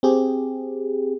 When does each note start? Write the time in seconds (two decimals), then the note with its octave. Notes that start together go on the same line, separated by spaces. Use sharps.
0.03 C4 G4 G#4